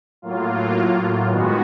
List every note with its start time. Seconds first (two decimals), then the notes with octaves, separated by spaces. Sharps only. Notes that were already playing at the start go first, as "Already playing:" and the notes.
0.22 A2 F#3 A#3 F4
1.27 G2 D#3 G#3 B3 F#4